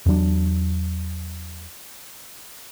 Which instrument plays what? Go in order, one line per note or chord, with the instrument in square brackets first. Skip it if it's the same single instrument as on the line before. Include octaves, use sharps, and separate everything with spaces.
[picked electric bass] E2 G2 F#3 D4